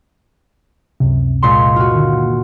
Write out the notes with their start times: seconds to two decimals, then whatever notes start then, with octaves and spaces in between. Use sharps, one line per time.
1.00 C#2 F#2 C3
1.43 A#2 G#3 C6
1.76 F4 F#4
1.91 D3 D#3 A#3